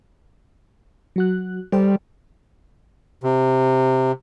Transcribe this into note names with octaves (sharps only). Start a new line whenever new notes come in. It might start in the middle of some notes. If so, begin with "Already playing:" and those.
F#3 F#4 F#6
G3 A4 C5 G5
C3